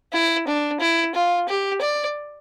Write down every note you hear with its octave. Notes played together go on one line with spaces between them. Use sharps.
E4
D4
E4
F4
G4
D5